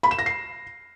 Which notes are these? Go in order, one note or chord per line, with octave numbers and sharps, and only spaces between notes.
B5
E7
A#6
C7